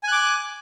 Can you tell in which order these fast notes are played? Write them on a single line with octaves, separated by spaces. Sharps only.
G#5 F#6 D6